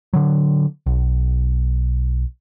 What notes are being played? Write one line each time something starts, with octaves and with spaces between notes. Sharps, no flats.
D3 F#3
B1